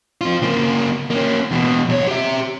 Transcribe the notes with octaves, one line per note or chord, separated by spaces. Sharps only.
C4 F4
C#3 A#3
A#3 C#4
E2 B2
B1 C#5
G4 E5